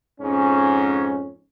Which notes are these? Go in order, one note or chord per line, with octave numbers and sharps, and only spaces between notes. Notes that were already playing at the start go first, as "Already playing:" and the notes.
F2 G#2 C#4